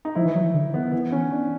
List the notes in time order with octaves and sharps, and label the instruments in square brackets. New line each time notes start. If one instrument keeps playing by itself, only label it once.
[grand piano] D#4
[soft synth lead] F3 [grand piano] E4
[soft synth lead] E3
F#3
E3
D3
[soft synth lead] D#3 [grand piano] B3
[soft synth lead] E3 [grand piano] B3
[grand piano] C#4
D4